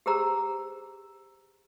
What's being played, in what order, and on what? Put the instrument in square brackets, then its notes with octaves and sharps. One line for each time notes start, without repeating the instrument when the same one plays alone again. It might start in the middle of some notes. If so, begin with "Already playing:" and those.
[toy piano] G4 G#4 B4 C5 A#5 E6